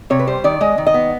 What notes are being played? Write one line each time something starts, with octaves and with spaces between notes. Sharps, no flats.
C3 C#5
B4
G3 C5
D#3 D5
G#3 D#5
D#3
D#5
B3